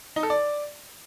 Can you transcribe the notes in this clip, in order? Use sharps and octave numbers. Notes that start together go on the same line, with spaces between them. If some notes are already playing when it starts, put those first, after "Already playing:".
D#4
A4
D5